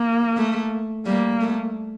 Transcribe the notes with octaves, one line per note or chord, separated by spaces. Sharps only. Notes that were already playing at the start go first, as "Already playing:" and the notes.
Already playing: A#3
A3
G3 A#3
A3